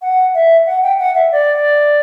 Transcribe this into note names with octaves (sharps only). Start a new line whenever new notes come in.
F#5
E5
F#5
G5
F#5
E5
D5